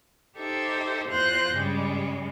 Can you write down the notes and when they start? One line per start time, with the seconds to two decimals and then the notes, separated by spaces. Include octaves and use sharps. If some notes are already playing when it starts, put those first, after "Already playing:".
0.37 D#4 G4 A4 C5 E5
1.08 E2 F4 C5 F#6 G6 A#6
1.52 G2 C#3 G3 G#3